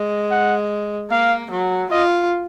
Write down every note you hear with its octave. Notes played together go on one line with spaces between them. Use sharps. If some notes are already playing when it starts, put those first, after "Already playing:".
Already playing: G#3
F#5
A#3 F5
F#3
F4 D#5